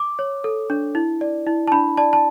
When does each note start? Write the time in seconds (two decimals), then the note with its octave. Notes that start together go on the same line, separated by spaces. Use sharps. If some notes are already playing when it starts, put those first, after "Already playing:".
Already playing: D6
0.19 C#5
0.44 A4
0.70 D4
0.95 E4
1.21 D5
1.47 E4
1.67 A5
1.72 D4 B5
1.97 D5 A5
2.13 A5